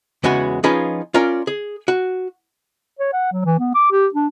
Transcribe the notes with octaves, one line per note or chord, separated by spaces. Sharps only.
E2 C#3 G#3 B3 F#4 G#5
F3 C#4 D#4 F4 G#4 B4
C#4 F4 A#4 D5 A#5
G#4
F#4
C#5
F#5
F#3
E3
B3
D6
G4
D4